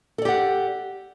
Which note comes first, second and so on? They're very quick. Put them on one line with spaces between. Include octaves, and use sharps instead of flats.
A4 D5 G4 F#5